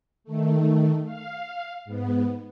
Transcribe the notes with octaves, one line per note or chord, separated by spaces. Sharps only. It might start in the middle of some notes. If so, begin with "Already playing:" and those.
D#3 A3
F5
G#2 B3